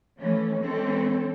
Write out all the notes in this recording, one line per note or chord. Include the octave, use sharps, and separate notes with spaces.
E3 F3 A3 C#4
E3 G#3 C4 C#4 A4